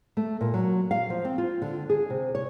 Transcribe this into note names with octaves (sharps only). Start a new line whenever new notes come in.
A3
A#2
F#3
F5
F3
C4
F4
D3
G#4
C3
C#5